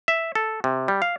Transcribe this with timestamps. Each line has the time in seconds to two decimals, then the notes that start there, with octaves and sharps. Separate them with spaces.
0.08 E5
0.35 A4
0.64 C3
0.88 G3
1.02 F5